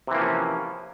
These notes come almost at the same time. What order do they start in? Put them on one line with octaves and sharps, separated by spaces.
C3 E3 A#3 F3 C#4